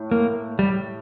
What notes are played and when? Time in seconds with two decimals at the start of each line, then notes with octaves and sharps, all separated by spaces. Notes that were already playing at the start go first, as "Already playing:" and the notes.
Already playing: A2
0.11 A#3
0.59 G3